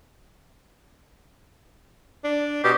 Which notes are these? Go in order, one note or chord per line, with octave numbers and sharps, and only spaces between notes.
D4
B2 G4